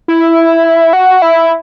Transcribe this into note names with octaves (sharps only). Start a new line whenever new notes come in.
E4
F#4
E4